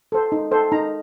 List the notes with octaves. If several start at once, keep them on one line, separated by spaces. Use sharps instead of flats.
A4 C5
D#4
A4 C5
D#4 A#5